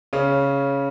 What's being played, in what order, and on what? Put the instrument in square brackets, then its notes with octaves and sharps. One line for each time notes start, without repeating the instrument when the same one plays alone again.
[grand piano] C#3 C#4